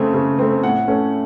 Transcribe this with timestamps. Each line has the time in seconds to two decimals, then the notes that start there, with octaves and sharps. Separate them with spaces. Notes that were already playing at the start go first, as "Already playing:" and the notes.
Already playing: C#3 A3 C4
0.14 C#3
0.39 A3 C4
0.63 A2 F#5
0.88 A3 C#4